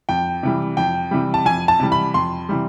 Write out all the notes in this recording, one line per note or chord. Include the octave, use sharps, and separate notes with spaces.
F2 G5
C3 E3 G3
F2 G5
C3 E3 G3
A5
F2 G#5
A5
C3 E3 G3
B5
F2 C6
C3 E3 G3